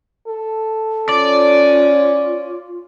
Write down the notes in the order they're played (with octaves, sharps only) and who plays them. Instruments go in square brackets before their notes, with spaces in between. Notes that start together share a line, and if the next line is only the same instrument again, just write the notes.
[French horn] A4
[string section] C#4 [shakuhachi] F4 [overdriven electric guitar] D5